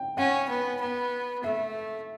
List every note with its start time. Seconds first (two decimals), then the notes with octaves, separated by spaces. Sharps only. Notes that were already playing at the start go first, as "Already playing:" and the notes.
Already playing: G5
0.17 C#4 F#5
0.49 B3
0.81 B3
1.44 A3 E5